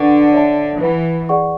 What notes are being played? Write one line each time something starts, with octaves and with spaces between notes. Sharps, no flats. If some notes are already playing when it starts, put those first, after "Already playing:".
Already playing: D3 B4 F#5 C#6
C#5 E5 A5
E3 B4 F#5 B5
G#4 D5 F#5 C#6